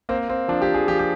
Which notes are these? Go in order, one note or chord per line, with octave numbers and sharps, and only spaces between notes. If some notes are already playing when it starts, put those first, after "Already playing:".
A#3 C4
A#3 C4
F3 D4
G4
F3
G#4
F3 G4
G4